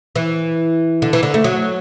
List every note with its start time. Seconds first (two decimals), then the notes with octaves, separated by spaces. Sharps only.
0.16 E3
1.02 D3
1.13 E3
1.23 D3
1.34 A3
1.44 F#3